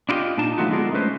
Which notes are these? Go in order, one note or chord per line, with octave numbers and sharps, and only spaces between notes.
D4 E4 F4 G4 D#5
A#2 D4 D#4 A5
F3 G3 A3 D#4 F4 F#4
D3 G#3 B3 F4 G#4 A#4
G#3 A3 C#4 B4 C5